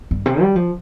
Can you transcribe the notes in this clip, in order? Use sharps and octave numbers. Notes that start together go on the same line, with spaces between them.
G2
C3
G3
F3